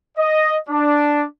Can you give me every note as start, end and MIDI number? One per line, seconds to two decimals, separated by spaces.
0.18 0.57 75
0.69 1.25 62